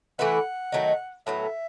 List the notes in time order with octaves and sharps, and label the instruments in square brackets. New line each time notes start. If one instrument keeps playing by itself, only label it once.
[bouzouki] E3 A3 E4 B4 [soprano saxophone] F#5
[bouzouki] D#3 F#3 A3 D#4
[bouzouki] A2 F#3 B3 [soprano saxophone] E5